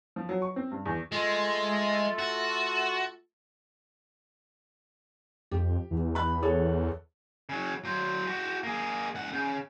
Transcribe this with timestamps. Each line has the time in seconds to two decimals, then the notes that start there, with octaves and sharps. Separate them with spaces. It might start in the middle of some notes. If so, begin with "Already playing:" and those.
0.16 F3
0.29 F#3
0.42 C#6
0.56 C4
0.71 G2
0.86 E2
1.12 G#3 A3 F4 A4
2.19 F#4
5.51 F2 G4
5.91 E2
6.15 B5 F#6
6.42 G#4 A4 C#5
7.49 C#3 F#3
7.84 F#3 C5
8.27 F#4 G4
8.63 A#3 G#4
9.15 C#2 F#5
9.33 C#3